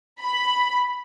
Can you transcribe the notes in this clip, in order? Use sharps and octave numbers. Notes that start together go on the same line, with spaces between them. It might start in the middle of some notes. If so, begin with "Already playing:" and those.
B5